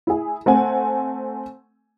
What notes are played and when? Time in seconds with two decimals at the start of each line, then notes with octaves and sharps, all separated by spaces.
0.07 E4 G#4
0.46 A3 C4 F#5 G#5